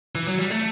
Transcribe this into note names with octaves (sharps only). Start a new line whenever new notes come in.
E3
F#3
G3
A3